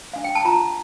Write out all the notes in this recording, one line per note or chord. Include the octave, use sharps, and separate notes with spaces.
D4 F5
G5
A5
F4 A#5